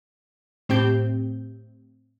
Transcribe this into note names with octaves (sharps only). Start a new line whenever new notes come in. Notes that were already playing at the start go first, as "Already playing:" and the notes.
A2 C4 G4 G6